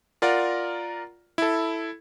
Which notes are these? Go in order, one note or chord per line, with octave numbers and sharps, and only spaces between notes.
F4 A#4 D5 F#5 A#5
E4 A4